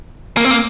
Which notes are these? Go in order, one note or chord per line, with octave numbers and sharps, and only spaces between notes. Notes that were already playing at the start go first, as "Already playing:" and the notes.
A#3
C4
A#3